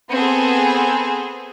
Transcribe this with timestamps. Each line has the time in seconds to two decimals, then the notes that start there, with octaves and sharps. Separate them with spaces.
0.12 B3 C4 G#4 A4